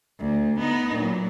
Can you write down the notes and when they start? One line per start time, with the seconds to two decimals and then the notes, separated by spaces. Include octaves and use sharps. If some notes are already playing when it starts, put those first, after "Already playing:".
0.20 D2
0.59 B3 D#4
0.94 A#2 F#3